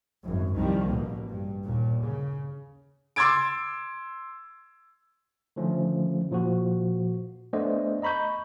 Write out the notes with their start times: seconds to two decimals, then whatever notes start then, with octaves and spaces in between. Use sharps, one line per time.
0.23 G#1 F#2
0.55 C2 D#3 F3 G3
0.87 A1 B2 A#3
1.30 G2
1.64 D#2 A#2
2.02 C#3
3.16 C6 D6 E6 G#6 A6 D7
5.56 D3 D#3 F3 A3 C#4
6.31 A#2 F3 F#4
7.53 A3 B3 D4 C5 D5 D#5
8.02 D#5 A#5 B5 C#6 G6